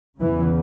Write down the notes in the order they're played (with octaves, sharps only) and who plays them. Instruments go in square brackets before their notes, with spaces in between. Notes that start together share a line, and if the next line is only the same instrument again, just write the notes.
[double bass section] E2 C#3 E3